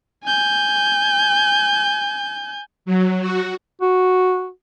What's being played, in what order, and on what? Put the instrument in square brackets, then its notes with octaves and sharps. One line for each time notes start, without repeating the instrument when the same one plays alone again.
[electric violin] G#5 G6
[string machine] F#3
F#4
[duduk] F#4